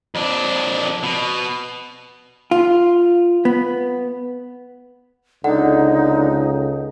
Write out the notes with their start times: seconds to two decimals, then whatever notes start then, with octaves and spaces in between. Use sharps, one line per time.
0.15 F2 D4
1.03 B2
2.51 F4
3.45 B3
5.44 C#2 D3 D#4 F#5